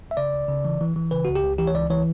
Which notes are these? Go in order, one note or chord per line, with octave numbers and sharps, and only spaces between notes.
E5
C#3 D5
C#2
C#3
E3
E3
E3
C#3 B4
C#2 F#4
G4
C#2
E3 G4
C#5
C#2 D5
E3 C#5